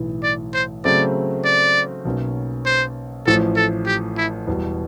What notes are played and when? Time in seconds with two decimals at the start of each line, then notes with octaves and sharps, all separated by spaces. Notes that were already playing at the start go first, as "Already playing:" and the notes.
Already playing: B1 A2 E3
0.24 D5
0.54 C5
0.84 C#3 F#3 A3 C4 D5
1.45 D5
2.05 B1 B2 F#3 A#3 C#4
2.66 C5
3.27 A1 A2 F3 A4
3.57 A4
3.87 G4
4.17 E4
4.47 E1 E2 B2 G3